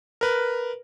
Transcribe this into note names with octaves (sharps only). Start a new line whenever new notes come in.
A#4 B4